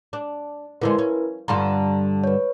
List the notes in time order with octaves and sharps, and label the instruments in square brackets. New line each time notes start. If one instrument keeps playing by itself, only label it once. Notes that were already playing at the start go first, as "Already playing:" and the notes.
[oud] D4
[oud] D3 F3 G#3 [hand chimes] E4 A#4 B4
[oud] C#4
[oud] G2 D3 F4 [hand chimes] A#5
[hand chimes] B4 C#5